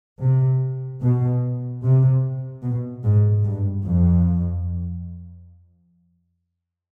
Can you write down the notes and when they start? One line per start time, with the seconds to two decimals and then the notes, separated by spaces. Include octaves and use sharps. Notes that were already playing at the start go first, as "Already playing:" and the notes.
0.21 C3
1.01 B2
1.82 C3
2.62 B2
3.04 G#2
3.44 G2
3.84 F2